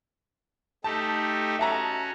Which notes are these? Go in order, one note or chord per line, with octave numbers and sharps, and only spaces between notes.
A3 D#4 G4 A5
C#4 F#4 E5 A5 A#5